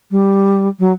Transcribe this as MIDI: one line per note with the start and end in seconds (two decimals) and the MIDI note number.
0.11 0.68 55
0.79 0.92 54